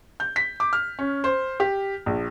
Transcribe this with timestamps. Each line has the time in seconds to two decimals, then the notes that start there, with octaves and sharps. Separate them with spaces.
0.20 G6
0.36 B6
0.60 D6
0.73 F6
0.99 C#4
1.24 C5
1.60 G4
2.06 A#1